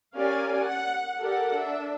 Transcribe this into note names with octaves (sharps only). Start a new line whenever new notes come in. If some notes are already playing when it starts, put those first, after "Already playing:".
C#4 G4 A#4 D5 F5 G#5
F#5
G4 A4 A#4 D5 F#5
D4 E5